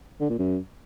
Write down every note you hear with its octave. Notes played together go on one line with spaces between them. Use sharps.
D3
A#2
F#2